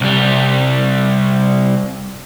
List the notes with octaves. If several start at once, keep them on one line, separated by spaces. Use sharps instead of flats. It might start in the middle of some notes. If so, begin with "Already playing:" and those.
C2 G3